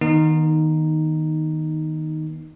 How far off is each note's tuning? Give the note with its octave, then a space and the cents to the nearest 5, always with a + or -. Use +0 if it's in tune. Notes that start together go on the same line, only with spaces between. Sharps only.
D#3 +10 B3 -35 D#4 -5